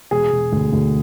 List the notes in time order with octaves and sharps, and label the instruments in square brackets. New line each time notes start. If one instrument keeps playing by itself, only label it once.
[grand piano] E1 G#4
E1
D2
D2